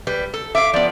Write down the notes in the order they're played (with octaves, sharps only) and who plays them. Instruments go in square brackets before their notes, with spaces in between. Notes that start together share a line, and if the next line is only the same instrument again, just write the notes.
[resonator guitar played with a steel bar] G3 B4
A4
[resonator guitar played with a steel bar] E5 F5 [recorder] D6
[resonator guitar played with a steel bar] F3 B3 [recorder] D5